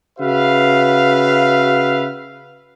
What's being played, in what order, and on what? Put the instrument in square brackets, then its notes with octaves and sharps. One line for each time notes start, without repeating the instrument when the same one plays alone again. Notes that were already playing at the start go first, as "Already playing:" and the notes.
[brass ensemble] C#3 F#4 B4 E5 F5